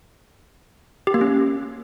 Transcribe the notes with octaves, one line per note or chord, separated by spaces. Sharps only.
G4
A#3
C#4